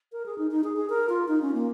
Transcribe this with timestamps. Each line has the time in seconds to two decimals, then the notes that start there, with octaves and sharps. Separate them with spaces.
0.12 A#4
0.26 G#4
0.38 D#4
0.51 D#4
0.64 G#4
0.77 G#4
0.90 A#4
1.09 F4
1.28 D#4
1.42 C#4
1.54 A#3